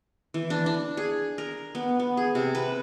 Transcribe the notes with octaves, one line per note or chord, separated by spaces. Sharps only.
E3
D4
D4
G#4
A#4
B3
B3
G#4
C3
B4